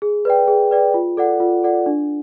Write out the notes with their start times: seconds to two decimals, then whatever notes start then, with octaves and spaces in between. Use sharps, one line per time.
0.02 G#4
0.25 B4 D5 G5
0.48 G#4
0.71 B4 D5 G5
0.94 F4
1.17 A4 D5 F#5
1.40 F4
1.63 A4 D5 F#5
1.86 D4